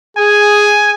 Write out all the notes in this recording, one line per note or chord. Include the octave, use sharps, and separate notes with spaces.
G#4 G#5